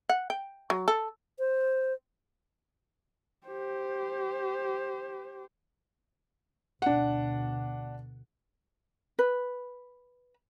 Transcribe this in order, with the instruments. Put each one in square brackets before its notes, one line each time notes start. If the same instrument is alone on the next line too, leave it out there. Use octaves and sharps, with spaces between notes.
[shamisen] F#5
G5
F#3
A4
[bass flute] C5
[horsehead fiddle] G4 C5
[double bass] D2 B2 [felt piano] D4 F#5
[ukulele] B4